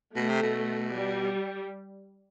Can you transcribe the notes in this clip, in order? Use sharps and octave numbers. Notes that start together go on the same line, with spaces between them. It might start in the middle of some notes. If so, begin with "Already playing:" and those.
B2 A3
C3
B2
G3